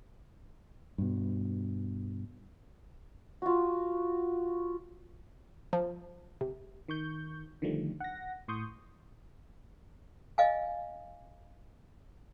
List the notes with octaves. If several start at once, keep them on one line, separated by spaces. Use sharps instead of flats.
G2 B2
F4 F#4
F3
C3
D#3 C#6 G6
D3 D#3 F3 G3 A3
F#5 A#6
A2 C6 C#6 D#6 G6
D#5 F5 G#5